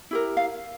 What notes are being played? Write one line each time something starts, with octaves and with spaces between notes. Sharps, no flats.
E4 G4 A#4
F5